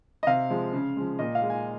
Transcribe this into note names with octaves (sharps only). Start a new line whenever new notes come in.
D#5
C3 F5
F3 G#3
C#3
F3 G#3
A#2 D#5
F5
G#3
G#5